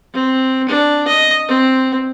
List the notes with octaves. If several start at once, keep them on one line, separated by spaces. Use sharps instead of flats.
C4
D4
D#5
C4